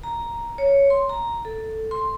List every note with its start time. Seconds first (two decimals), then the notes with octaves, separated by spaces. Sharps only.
0.03 A#5
0.58 C#5
0.90 C6
1.09 A#5
1.45 A4
1.91 C6